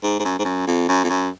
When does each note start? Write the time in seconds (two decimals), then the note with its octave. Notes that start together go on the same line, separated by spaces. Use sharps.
0.03 G#2
0.19 G#2
0.25 F#2
0.39 G#2
0.45 F#2
0.67 F2
0.89 F#2
1.04 F2
1.09 F#2